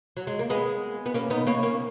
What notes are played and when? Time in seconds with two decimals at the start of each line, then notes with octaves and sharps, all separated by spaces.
0.17 F#3
0.27 G#3
0.39 A#3
0.50 G#3 B3
1.06 B3
1.14 A#3 C#4
1.30 B3 D#4
1.47 A#3 C#4
1.63 A#3 C#4